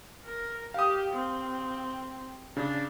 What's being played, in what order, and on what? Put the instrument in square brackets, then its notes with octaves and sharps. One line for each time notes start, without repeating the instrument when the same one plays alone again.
[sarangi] A#4
[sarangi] G4 [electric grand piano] F5 D#6
[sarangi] C4
[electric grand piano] C#3 [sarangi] D4